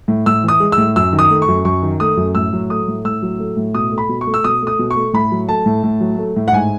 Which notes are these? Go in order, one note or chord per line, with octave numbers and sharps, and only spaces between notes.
A2
A2 E6
E3 D#6
G#3
E6
A2
F#2 E6
D#3
D#6
A3
C#6
F#2
F#2 C#6
D#3
A3 D#6
F#2
A2 E6
F#3
A3 D#6
A2
A2 E6
F#3
A3
A2
B2 D#6
A3
B5
B2
C#6
A3
E6
B2 D#6
A3 D#6
B2
C#6
A3
A2 B5
F#3
A3 A5
A2
A2
F#3
A3
A2
F#5
G#2 G#5